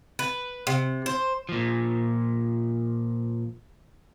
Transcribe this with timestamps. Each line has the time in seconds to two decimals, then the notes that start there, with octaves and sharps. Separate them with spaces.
0.19 B4
0.67 C3
1.06 C5
1.49 A#2 F3